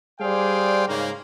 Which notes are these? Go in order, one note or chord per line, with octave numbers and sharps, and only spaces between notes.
G3 G#4 C5 D5 F5 G5
G#2 C#3 A#3